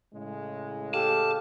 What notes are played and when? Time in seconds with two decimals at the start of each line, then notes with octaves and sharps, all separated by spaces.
0.14 A2 C#3 G#3
0.94 G4 A4 F5 A5